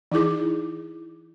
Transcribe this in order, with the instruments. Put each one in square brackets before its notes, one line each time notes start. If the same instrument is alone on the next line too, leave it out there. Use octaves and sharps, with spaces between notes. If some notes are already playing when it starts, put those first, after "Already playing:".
[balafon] E3 D#4 E4 G#4 D6